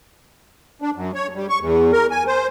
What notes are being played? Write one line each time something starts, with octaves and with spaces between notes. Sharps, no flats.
D4
F#2
C#5
G3
C#6
E2
A#4
G#5
C5